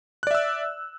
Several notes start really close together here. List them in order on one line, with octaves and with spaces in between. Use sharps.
F#6 D5 E5 E6